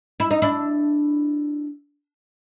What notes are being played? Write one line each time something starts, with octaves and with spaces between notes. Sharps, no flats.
E4
D#4
D4 E4